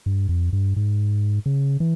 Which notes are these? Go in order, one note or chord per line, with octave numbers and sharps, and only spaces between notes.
G2
F2
G2
G#2
C#3
E3